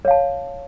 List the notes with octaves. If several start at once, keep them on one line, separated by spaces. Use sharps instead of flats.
C#5 F5 A5